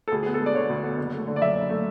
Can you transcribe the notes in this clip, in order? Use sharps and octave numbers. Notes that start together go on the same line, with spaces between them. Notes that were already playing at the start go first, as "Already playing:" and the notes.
A4
D2 G#4
B3 G#4
A4
G#3
D5
D3 C#5
D2
B3
F#1
A3
D3
D5
F#2 E5
F#1
A3